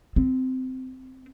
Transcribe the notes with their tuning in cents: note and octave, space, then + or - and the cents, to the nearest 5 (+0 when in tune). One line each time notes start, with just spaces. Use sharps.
C4 -15